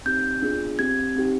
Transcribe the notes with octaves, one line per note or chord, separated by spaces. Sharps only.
C4 D#4 G4 G6
B3 D4 F4 G#4
C4 G4 G#6
C4 D#4 G4